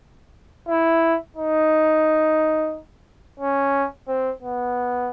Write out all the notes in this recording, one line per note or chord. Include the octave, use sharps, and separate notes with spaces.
E4
D#4
C#4
C4
B3